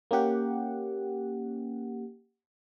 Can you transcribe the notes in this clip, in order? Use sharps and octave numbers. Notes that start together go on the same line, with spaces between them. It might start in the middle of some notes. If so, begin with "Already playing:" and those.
A#3 C#4 G4 F#5